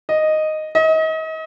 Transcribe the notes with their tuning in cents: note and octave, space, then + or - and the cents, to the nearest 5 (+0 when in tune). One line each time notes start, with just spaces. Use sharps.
D#5 -5
D#5 +35